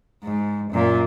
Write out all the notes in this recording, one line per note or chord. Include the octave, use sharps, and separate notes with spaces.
G#2
F#2 A#2